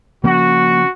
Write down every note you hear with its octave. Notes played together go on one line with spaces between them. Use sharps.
C#3 F3 A#3 C#4 F#4